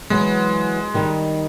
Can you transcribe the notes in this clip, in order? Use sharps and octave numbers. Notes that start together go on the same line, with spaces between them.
E3 F#3 G#3 B3
D#3 G3 D#4